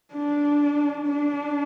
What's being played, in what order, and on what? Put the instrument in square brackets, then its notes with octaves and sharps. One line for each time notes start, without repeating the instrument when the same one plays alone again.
[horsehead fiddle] D4
D4